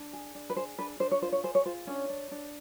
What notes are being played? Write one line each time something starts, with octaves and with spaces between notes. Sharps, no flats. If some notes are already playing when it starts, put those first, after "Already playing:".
Already playing: D4
G#4
D4
B4
G#4 C5
D4 B4
D4 C5
C#5
F4 C5
C#5
G#4 C5
C#5
F4 C5
C#4 D4 C#5
D4
D4